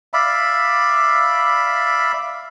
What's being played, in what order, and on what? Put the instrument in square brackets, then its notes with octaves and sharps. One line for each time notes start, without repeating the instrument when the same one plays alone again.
[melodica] D5 E5 F5 B5